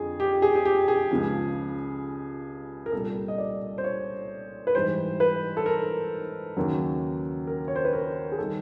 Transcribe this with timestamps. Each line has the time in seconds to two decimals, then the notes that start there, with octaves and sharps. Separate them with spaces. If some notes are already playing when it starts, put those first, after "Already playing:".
Already playing: F2 D3 F3 G#4
0.20 G4
0.42 G#4
0.55 G#4
0.65 G4
0.88 G#4
1.11 C#2 C#3 F3
2.86 A#4
2.92 C2 A#2 G3 A4
3.28 D#5
3.38 D5
3.78 C5
3.84 C#5
4.67 B4
4.75 G#2 E3 G3 C5
5.20 B4
5.57 A4
5.66 A#4
6.57 D#2 C#3 F#3
7.47 A#4
7.68 C#5
7.76 C5
7.84 B4
7.93 A#4
8.32 G#4
8.38 D#3 G3 A4